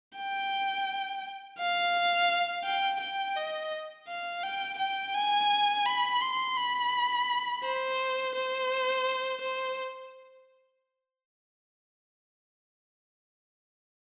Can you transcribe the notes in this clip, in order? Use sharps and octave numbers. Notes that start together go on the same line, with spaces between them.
G5
F5
G5
G5
D#5
F5
G5
G5
G#5
B5
C6
B5
C5
C5
C5